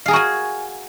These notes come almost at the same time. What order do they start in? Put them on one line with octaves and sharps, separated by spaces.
F5 G#4 A#4 F#4 G#5